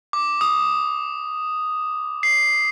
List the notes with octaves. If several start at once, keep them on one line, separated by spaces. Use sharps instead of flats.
D6
D#6
C7